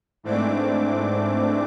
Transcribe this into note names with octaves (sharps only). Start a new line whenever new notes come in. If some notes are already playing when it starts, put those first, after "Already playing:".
G#2 E3 A3 C4 D4 D6